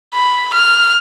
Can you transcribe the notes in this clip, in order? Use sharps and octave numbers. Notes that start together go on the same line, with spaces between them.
B5
F6